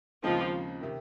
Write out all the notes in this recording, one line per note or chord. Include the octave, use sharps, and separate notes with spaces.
D#2 C#3 F3 G#3 C4 D#4
C3 D#3